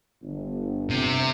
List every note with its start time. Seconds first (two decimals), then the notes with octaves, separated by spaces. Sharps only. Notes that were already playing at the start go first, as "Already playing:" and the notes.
0.22 G1
0.90 C3